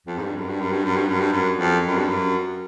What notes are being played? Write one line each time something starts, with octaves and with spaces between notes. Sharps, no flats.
F2
G#2
G2
F#2
G2
F#2
G2
F#2
G2
F#2
G2
F#2
F2
F#2
G2
F#2